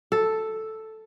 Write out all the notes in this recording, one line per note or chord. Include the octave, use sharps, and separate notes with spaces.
A4